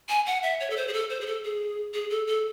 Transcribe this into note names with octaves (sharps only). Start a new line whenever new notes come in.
G#5
F#5
E5
C#5
A4
C5
G#4
A4
C5
G#4
A4
G#4
G#4
A4
A4